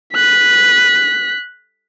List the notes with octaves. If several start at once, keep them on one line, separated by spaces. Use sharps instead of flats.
F#6 B6